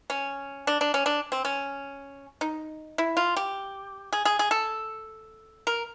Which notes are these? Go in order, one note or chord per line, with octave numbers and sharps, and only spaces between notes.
C#4
D4
D4
C#4
D4
C4
C#4
D#4
E4
F4
G4
G#4
G#4
G#4
A4
A#4